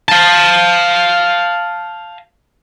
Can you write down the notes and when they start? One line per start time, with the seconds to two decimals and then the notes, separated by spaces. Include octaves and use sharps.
0.09 F5 A5